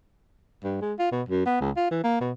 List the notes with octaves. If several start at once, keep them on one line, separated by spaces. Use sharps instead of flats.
G2
G#3
F4
B2
F#2
B3
C#2
F4
E3
A#3
B2